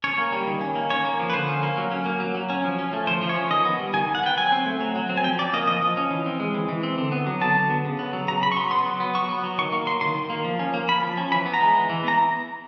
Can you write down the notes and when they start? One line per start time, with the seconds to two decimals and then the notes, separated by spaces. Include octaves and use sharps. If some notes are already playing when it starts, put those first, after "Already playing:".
0.04 C#4 C#5
0.18 A#3
0.32 G3
0.47 D#3
0.61 C#4
0.76 A#3
0.90 C#4 C#5
1.05 A#3
1.19 F3
1.30 B4
1.33 D3 C5
1.48 C#4
1.63 A#3
1.77 F#3
1.91 C#4
2.06 A#3
2.20 F#3
2.35 F#3
2.50 C#4
2.64 F3
2.79 C#4
2.93 A3
3.07 F3 C5
3.22 F3
3.29 C#5
3.36 C#4
3.50 D#3 D#5
3.65 B3
3.79 G3
3.94 D#3 G#5
4.08 D#3
4.15 F#5
4.23 B3 G5
4.37 F#3 G#5
4.52 C4
4.66 A3
4.81 F#3
4.96 F#3
5.09 C4
5.17 G#5
5.24 F3 G5
5.39 C#4 D5
5.54 A#3 D#5
5.67 F3 D#5
5.82 F3
5.97 C#4
6.11 E3
6.26 C4
6.40 G#3
6.54 E3
6.69 E3
6.83 C4
6.98 D3
7.12 B3
7.26 F#3
7.41 D3 A5
7.56 D3
7.70 B3
7.85 C#3
7.99 B3
8.13 F#3
8.28 C#3 A#5
8.42 C#3 B5
8.52 C#6
8.57 B3 C6
8.71 B3 C6
8.86 F#3
9.00 B3
9.15 F#3 C#6
9.29 B3
9.44 F#3
9.58 D#3 C#6
9.72 A#3
9.87 F#3 C6
10.01 D#3 C6
10.16 D#3
10.30 A#3
10.45 F3
10.59 C#4
10.74 A#3
10.88 F3 B5
11.03 F3
11.17 C#4
11.32 E3 B5
11.46 B3
11.54 A#5
11.61 G#3
11.75 E3
11.89 E3
12.04 B3 A#5